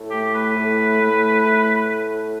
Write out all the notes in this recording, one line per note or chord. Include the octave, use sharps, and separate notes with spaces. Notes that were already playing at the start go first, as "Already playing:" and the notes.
Already playing: A2
A3 G4
B4
A2
A3
A2